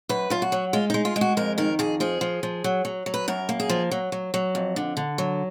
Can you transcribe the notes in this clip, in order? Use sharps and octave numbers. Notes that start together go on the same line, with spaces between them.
F#2 B4
F#2 F4
F#4
F#3
G#3 F4
G#3 D#4
F4
G#3
F#4
F2 A#4
D#3 A#4
F2 G#4
F3 G#4
F3
F3
F#3
F#3
F#3
B4
F#2 A#4
A#3
G#4
F3
F#3
F#3
F#3
F2
D3
D3
F#3